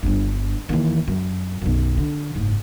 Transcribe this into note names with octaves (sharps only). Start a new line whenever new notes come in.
G1 G2
D#2 E3
F#2
B1 F#2
D3
F#1 G#2